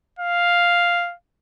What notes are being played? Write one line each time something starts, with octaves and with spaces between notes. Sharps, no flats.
F5